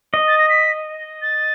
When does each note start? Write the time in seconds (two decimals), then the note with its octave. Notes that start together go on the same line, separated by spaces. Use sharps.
0.14 D#5
0.28 A6
0.38 A#6
0.49 B6
1.22 A6